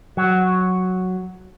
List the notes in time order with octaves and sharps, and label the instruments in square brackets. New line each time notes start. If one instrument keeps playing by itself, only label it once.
[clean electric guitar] F#3